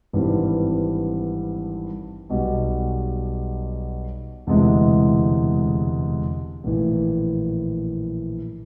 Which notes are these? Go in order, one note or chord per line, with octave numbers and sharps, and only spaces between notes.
G#1 G2 E3 G3 C4
B1 B2 G3
E1 D2 C3 E3 G#3
A#1 A2 E3